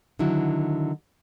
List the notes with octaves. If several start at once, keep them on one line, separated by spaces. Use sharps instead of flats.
D3 D#3 F#3 E4